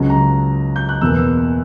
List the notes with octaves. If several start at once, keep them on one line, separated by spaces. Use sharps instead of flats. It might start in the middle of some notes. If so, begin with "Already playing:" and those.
Already playing: C#2 C#3 F#3
A#5
G6
F#6
E2 B2 A#3 E6